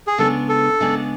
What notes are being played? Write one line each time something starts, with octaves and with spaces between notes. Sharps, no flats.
G#4
C#3 G#3 B3 D4 A4
A4
C#3 G#3 B3 D4